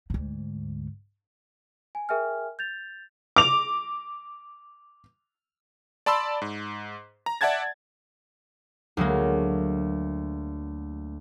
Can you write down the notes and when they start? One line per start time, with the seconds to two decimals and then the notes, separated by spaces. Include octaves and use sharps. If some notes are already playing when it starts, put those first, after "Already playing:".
0.10 D2 G#2
1.95 G#5
2.09 G#4 A#4 E5 G5 G#5 F6
2.59 G6 A6 F7
3.36 D6 F7
6.06 D5 A5 B5 C6 E6
6.42 G#2
7.26 A#5
7.41 D5 E5 F#5 A5 G#6 A6
8.97 D2 F#3 G#3 A#3